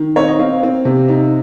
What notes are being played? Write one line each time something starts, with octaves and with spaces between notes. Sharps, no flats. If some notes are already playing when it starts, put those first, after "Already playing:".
Already playing: D#3
C4 C#5
D#5
C4 F5
C4
C3
D#4